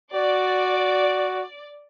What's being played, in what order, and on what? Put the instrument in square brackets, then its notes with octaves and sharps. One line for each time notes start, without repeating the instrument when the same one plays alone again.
[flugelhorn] F#4 [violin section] D5